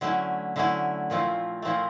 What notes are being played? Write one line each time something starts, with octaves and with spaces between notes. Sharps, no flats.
D3 F#3 A3 C#4 E4
D3 F#3 A3 C#4 E4
A#2 F3 A3 C4 E4
A#2 F3 A3 C4 E4